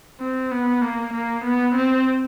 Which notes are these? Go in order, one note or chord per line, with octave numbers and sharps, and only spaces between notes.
C4
B3
A#3
A#3
B3
C4